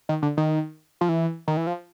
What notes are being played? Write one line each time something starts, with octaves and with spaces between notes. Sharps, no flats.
D#3
D3
D#3
F3
E3
D#3
E3
F3